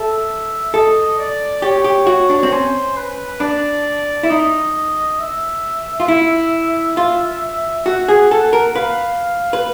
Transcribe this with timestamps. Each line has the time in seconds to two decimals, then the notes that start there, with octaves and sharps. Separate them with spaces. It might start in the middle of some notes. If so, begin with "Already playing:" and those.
Already playing: A4 E5
0.74 A4 D#5
1.18 D5
1.62 G4 C#5
1.84 G4
2.07 F#4
2.30 D4
2.43 C4
2.52 C#4 C5
2.97 B4
3.40 D4 D5
4.23 E4
4.30 D#4 D#5
5.19 E5
6.00 F4
6.08 E4
6.97 F4
7.86 F#4 F#5
8.08 G#4
8.31 A4
8.53 A#4
8.75 B4 F5
9.53 B4